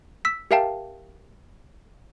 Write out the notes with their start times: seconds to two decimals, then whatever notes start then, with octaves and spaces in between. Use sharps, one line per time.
0.25 E6 B6
0.51 G4 A#4 E5 F5 G5 A5